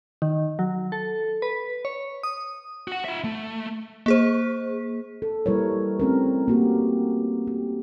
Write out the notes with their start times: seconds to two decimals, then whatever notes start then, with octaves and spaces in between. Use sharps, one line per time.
0.22 D#3
0.59 F#3
0.92 A4
1.42 B4
1.85 C#5
2.23 D#6
2.88 F#4 F#5
3.04 F4 E5
3.24 A3
4.06 A#3 G#4 C5
5.22 A4
5.46 G3 A#3 E4 A#4 B4 C#5
6.00 A3 C4 C#4 A#4
6.48 A#3 F#4 G4
7.47 G4